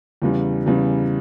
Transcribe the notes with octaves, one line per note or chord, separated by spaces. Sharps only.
E2 C#3 G3
E2 C#3 G3